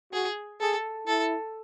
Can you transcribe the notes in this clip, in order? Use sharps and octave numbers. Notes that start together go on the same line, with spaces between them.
F#4 G#4
G#4 A4
E4 A4